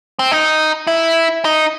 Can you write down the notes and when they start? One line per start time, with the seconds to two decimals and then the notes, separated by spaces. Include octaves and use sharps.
0.19 C4
0.31 D#4
0.87 E4
1.45 D#4